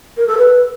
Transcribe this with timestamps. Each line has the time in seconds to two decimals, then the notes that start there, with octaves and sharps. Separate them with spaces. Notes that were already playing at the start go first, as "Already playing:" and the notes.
0.16 A#4
0.27 A4
0.37 B4